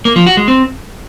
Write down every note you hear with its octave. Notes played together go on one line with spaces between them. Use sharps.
A#3
F3
F#4
G#3
C4